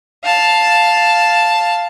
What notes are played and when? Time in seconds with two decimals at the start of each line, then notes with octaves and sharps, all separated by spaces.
0.24 F5 A5